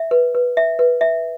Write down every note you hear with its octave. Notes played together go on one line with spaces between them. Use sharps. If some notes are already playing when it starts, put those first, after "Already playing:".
Already playing: E5
B4
B4
E5
B4
E5